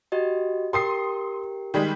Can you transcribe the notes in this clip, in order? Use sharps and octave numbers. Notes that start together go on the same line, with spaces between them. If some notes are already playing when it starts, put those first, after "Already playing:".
F#4 G4 D#5
G4 A#4 G5 C6 D#6 C7
D#3 G3 G#3